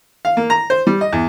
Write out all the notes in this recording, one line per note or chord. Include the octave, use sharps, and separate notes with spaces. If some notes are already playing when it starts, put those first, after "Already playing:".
F5
A#3
A#5
C5
G3
D#5
E2